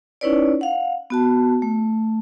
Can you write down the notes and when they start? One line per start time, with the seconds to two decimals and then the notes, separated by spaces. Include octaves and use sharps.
0.21 C#4 D#4 E4 B4 C#5 D5
0.61 F5 F#5
1.10 B3 F#4 A5
1.62 A3